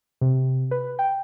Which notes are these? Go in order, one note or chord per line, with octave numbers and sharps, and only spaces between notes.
C3
B4
G5